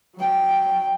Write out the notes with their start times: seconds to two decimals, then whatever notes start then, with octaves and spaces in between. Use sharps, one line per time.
0.16 F#3 G5